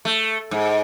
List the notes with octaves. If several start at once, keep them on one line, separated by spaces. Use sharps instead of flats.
A3
G#2